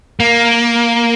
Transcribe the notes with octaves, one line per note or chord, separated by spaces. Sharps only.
A#3